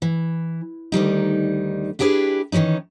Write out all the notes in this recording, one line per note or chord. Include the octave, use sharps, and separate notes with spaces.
E3
D2 D#3 G3 D#4
D4 E4 G4 G#4 A#4 B4
D#3 E3 G3 C#4 D#4